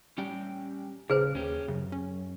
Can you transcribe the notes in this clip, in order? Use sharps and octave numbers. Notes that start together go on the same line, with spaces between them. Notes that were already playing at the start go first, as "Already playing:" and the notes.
G3 C#4 G4 G5
D#1 C#3 G#4 B4 C5
D#2 C#4 G4
F#2 C#3
C#4